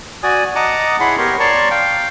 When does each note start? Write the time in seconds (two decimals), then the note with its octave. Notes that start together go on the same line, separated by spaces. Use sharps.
0.23 F#4 D5 G#5 D#6
0.56 D#5 F#5 A5 A#5 D6 D#6
1.00 E4 G#4 C#5 F#5 B5 C6
1.18 B3 G4 A#4 C#5 C6 C#6
1.40 C#5 D5 A5 A#5 C6 C#6
1.71 F5 G5